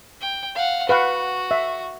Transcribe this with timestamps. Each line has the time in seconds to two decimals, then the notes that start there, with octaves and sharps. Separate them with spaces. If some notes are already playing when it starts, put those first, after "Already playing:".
0.21 G5
0.55 F5 F#5
0.89 F#4 B4 F5 F#5
1.51 E5